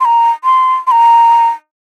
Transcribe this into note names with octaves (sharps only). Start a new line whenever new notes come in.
C6
A#5
C6
C6
A#5